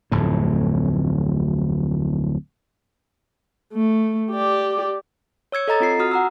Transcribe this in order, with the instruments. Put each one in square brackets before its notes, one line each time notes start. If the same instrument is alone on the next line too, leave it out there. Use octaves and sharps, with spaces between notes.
[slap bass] D1 F2 A2
[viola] A3
G4 D5
[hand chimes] C#5 E6 G#6 C#7
A4 D#5 A#5 A6
C4 F4 C7
F#4 D#6 F6
F#5 A#5 E6